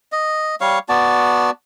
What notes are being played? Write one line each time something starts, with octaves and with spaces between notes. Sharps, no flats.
D#5
G3 C#5 F5 C#6
B3 F#4 D5 A5